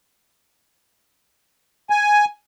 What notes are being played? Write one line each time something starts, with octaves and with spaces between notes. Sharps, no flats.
G#5